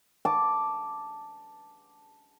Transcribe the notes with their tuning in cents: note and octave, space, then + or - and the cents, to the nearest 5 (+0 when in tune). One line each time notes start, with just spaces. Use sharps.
A5 +0 D6 +0